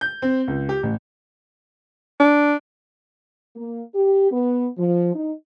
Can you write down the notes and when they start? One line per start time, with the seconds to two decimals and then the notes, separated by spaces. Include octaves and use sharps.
0.01 G6
0.22 C4
0.48 C#2
0.69 G4
0.83 A1
2.20 D4
3.56 A#3
3.94 G4
4.31 B3
4.78 F3
5.15 D#4